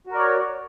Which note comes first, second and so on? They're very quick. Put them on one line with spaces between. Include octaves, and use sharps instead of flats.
F#4 A#4 D5 C#5